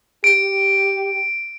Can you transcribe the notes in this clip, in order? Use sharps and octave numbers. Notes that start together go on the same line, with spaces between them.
G4 D7